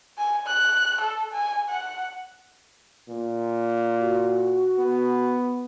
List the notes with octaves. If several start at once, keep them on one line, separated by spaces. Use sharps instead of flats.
G#5
F#6
A4
G#5
F#5
A#2
F#4
B3